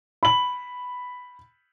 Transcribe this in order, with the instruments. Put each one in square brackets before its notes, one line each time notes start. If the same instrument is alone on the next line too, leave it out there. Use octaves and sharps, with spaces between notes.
[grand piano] B5 F#7